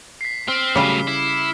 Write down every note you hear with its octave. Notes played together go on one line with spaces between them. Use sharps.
B6 C7
C4 F6 C7
A2 C#3 F#3 G3 D6 C7
E4